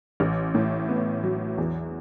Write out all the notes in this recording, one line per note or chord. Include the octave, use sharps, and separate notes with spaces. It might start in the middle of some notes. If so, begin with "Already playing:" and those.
A1
A2
B3
F#3
E2